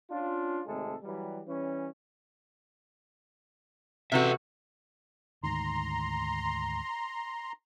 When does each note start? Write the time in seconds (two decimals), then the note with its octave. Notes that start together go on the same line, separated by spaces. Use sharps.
0.11 C#4 D4 F4
0.67 G#1 C3 G#3 A3 A4
1.03 E3 F#3 G3
1.48 E3 G3 C#4
4.12 C3 F#4 A4 B4 E5
5.43 D2 G#2 D#3 A#5 C6